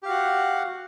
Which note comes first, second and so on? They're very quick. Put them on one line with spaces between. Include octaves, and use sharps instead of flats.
G4 F5 F#4 F#5